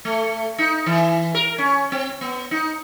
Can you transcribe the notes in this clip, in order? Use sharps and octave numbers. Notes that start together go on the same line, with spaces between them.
A3
D#4
E3
A#4
C#4
C4
B3
D#4